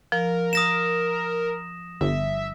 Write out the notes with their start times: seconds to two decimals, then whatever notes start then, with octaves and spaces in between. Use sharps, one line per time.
0.12 F3 A#4
0.53 D#6 A#6 E7
2.01 G1 E5